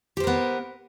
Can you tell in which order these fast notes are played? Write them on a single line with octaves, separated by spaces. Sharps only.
G4 C5 A#4 B3